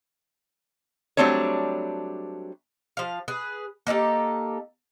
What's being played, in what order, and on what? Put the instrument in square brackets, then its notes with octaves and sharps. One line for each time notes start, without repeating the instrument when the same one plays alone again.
[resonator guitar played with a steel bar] F#3 G3 A3 C4 D4 C#5
[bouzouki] F3 F5
G#4 B4
A#3 D#4 G4 A4